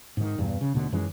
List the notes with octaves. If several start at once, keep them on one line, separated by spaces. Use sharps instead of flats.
G#2 D#3
E2 G2 B2
C#3
D#2 B2 D3 A3
F#2 D#3 E3 G#3